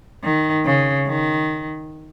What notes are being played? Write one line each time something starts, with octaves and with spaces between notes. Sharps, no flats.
D#3
C#3
D#3